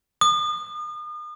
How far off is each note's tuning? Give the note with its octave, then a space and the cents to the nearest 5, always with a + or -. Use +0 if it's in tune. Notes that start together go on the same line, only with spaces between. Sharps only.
D#6 -40